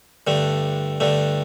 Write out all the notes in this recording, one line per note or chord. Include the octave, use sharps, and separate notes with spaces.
G2 D3 A3
G2 D3 A3